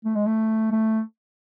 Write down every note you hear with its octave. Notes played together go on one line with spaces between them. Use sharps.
A3
G#3
A3
A3